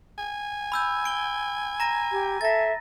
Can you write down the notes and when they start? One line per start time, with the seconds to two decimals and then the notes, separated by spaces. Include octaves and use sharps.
0.18 G#5
0.72 B5 E6 G6
1.05 D7 G7
1.80 A#5 A#6 D#7
2.12 G4
2.41 A4 E5 A5 A6 A#6